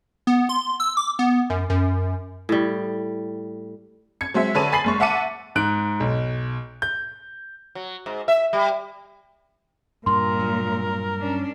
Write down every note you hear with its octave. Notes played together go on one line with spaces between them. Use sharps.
B3
C6
E6
D6
B3
F#2
F#2
A2 G3
G#6 C#7
F#3 G#3 C4 E5
D3 G#4 B4 C#5 A5 D#7
G#5 B5 A6 C7 F#7
F#1 G#3 C#6
E5 F#5 A5 D6 C#7 D#7
G#2 F#6 D7
B1
G6
F#3
G#2
E5
G3
G2 A#2 A#4 C6
G2 F#3
C#4 D4